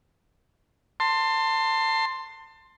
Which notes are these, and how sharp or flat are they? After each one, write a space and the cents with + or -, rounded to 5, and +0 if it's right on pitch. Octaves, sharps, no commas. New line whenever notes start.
A5 +30 C6 +0